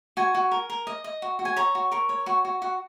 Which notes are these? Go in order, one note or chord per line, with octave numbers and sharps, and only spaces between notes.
F#4 G#5
F#4
A#4
A#4
D#5
D#5
F#4
F#4
G#5
C#5 A#5
F#4
A#4 C#6
C#5
F#4 C#6
F#4
F#4 F#5